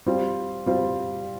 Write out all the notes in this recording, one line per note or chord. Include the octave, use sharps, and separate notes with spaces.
G3 C4 F4
G3 C4 F4